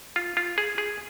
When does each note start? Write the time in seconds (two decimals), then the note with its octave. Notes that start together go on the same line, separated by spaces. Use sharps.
0.16 F4
0.37 F4
0.58 G#4
0.78 G#4